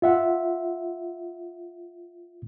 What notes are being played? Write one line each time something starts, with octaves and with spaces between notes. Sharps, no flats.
F4 E5 F#5